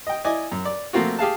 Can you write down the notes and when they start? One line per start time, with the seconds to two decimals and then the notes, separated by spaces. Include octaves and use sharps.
0.07 D#5 G5
0.25 E4 D5 D#5 G#5
0.52 F#2
0.65 D5
0.93 F3 A3 A#3 C4 F4 F#4
1.19 G4 G#4 F5 A5